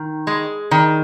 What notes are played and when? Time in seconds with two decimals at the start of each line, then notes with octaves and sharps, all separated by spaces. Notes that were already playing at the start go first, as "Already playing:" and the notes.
Already playing: D#3
0.27 G#3
0.71 D#3